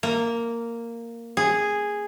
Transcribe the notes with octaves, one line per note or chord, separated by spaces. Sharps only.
A#3
G#4